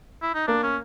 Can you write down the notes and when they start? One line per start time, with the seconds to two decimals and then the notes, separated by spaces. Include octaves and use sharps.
0.22 E4
0.34 D#4
0.47 A#3 D4
0.63 C#4